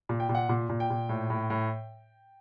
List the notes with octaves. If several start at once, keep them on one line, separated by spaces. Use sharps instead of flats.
A#2
G5
A#2
F#5
A#2
A#2
G5
A#2
A2
A2
A2